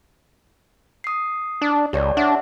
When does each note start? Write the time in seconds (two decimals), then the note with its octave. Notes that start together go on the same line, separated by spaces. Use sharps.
1.04 D#6 C7
1.62 D4
1.93 C#2 G4 C#5 D5
2.17 D4 E5 F#5